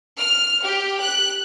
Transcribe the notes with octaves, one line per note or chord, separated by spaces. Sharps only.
F6
G4
F#6